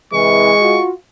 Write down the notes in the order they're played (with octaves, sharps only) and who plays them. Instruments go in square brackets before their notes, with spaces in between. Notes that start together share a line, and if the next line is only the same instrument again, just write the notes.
[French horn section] C3 E3 [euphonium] G#3 [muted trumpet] C#6
[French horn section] F4 F#4